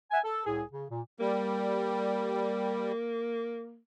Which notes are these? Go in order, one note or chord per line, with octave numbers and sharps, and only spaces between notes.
E5 F#5 G#5
A4
C2 A2 G#4
C#3
A#2
G3 A#3